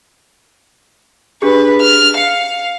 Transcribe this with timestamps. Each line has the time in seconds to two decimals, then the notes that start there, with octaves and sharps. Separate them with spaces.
1.42 D4 G4 G#4 B4
1.81 F6
2.17 F5 C#7